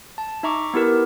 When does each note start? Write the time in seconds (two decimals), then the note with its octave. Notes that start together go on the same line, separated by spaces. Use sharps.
0.18 A5
0.43 D#4 E5 A#5 C#6 D6
0.74 B3 E4 G4 A#4 B4